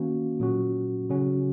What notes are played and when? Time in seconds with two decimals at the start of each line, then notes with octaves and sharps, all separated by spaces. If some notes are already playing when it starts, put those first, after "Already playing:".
Already playing: D#3 A#3 C#4 F#4
0.40 A#2 F#3 C#4 F#4
1.09 C#3 F#3 C#4 F#4